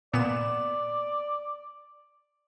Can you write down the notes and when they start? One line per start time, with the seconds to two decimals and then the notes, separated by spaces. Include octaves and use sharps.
0.14 A#2 B3 D5 E7